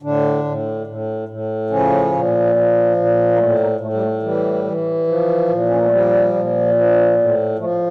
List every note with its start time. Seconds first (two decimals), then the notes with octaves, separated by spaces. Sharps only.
0.02 A2 D3 D4
0.44 A2
0.87 A2
1.29 A2
1.70 C#3 F3 C#4
2.12 A#2
2.55 F3
2.97 A#2
3.32 A#3
3.38 A2 A3
3.59 A#2 A#3
3.80 A2 A3
3.93 G3
4.02 A3
4.22 E3 G3
4.64 E3
5.07 F3
5.48 A#2
5.69 C#4
5.76 A#3
5.83 A3
5.91 F3 G3
6.33 A#2
6.74 F3
7.17 A2
7.59 F3 A3